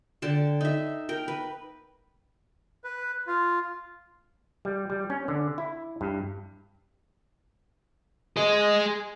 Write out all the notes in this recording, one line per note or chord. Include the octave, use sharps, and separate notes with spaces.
D3 G5 A5
D#4 E5
A#4 G5
B4
B4
F4
G3
G3
C#4
D3
E4
G2
G#4 D#5